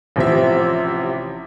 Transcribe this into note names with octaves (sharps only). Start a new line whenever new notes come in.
A1 C3 F3 E5